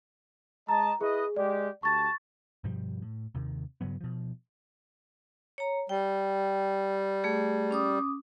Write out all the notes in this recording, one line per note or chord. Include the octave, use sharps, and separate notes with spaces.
G#3 D#5 A5 A#5
E4 G#4 B4 D#5
G#3 G4 D5
D2 G4 A5 C#6 A6
G2 B2 F3 G3
A2
D#2 C3 D#3
G2 C#3 F#3 B3
B2 F3
C#5 A#5
G3 G5
A3 G#4
C#4 D6 D#6